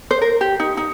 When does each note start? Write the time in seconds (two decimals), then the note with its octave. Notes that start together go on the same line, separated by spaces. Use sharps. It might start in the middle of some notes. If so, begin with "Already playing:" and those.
0.11 C5
0.21 A#4
0.41 G4
0.60 D#4
0.77 D#4